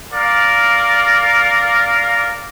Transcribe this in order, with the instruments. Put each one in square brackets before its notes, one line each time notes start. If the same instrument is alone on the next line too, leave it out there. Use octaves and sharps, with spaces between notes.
[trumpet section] A#4 D5 F5